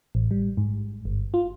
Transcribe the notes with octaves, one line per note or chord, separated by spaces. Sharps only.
A1
G3
G#2
G1
F4